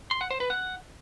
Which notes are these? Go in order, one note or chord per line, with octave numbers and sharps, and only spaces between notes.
C6
F#5
C5
B4
F#5